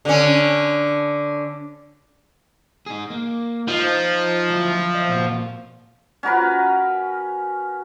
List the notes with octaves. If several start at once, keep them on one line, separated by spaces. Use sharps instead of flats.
D3 C#4
D#4 G#4
A#3
F3 D#4 D#5
F#3 E4
D#5 E5
A#2 F#4
C#4 F#4 A#4 B4